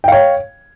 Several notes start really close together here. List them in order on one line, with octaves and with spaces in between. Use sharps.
G5 F5 C#5